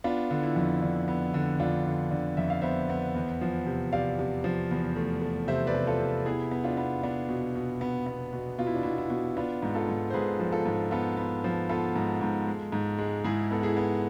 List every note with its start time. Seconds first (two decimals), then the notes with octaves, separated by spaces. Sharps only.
0.04 B3 D4 F4
0.31 D3
0.43 E4
0.56 F2
0.82 D3
1.08 B3
1.34 D3
1.60 F2 D4 F4
1.86 D3
2.11 D3
2.37 F2 E5
2.50 F5
2.62 B3 C5 E5
2.90 B3
3.15 E2
3.41 F3
3.66 C3
3.92 C3 D5 F5
4.19 C3
4.44 F3
4.71 E2
4.96 A3
5.22 A3
5.48 C3 C5 E5
5.67 B4 D5
5.74 C3
5.87 F4 A4
6.00 C3
6.25 B3 E4 G#4
6.51 B3
6.64 D4 F4
6.77 B3
7.03 B3 D4
7.29 B2
7.56 B2
7.81 B3
8.06 B3
8.33 B2
8.58 B2 F4
8.67 E4
8.75 D4
8.83 B2 E4
8.98 E4
9.10 B2
9.36 B3 D4 F4
9.63 G#2
9.75 F4 A4
9.89 G#2
10.10 C5
10.14 G#2 G#4 B4
10.40 F3
10.52 F4 A4
10.66 G#2
10.91 B3 F4 A4
11.17 B3
11.44 F3
11.69 B3 F4 A4
11.96 G#2
12.21 G#2
12.47 G#3
12.72 G#2
12.98 G#3
13.24 G#2 E4 G#4
13.50 B3 A4
13.63 E4 G#4
13.77 B3